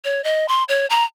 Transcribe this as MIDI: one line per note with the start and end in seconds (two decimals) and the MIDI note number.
0.05 0.23 73
0.24 0.46 75
0.48 0.64 84
0.69 0.86 73
0.90 1.04 82